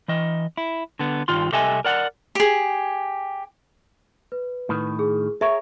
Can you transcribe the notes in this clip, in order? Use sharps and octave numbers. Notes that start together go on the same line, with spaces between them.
E3 D#5
E4
D3 B3
G2 D#3 F4 C6
C2 G4 A4 D#5 E5 G#5
A#4 D5 F#5
G4 G#4
B4
A2 D#3
G#4
G#4 A#4 C#5 E5 C#6